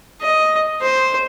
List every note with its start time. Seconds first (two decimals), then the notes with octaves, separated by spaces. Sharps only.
0.21 D#5
0.81 C5